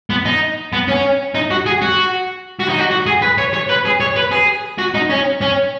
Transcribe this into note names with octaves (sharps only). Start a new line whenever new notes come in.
B3
D#4
B3
C#4
D#4
F#4
G#4
F#4
F#4
D#4
F#4
F#4
G#4
B4
C#5
C#5
B4
G#4
C#5
B4
G#4
F#4
D#4
C#4
C#4